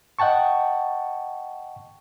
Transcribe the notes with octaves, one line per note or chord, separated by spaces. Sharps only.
D#5 F#5 G5 A5 C#6